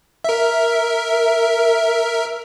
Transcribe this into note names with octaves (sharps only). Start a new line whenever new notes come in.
A#4 E5